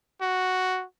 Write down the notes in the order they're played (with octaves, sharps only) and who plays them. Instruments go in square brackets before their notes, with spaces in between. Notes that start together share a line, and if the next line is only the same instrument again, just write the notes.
[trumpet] F#4